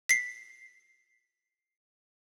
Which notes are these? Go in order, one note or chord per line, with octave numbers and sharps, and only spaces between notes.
B6 C7